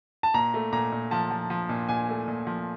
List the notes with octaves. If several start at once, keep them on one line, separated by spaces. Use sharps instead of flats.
A5
A#2 A#5
A3
A#2 A#5
A#2
F3 A5
F3
F3
A#2
A#2 G#5
A3
A#2
F3